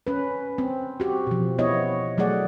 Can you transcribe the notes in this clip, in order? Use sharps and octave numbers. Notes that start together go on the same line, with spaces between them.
C#4 B4
C4
F#4 G4
B2 F3
B3 E4 C#5 D#5
F#3 A3 G#4 D5 F#5